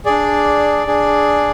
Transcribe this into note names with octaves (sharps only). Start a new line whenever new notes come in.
D4 G#4 D5
D4 G#4